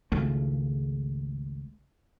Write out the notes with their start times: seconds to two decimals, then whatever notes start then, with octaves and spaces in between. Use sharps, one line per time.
0.12 G#1 C#2 C#3 A3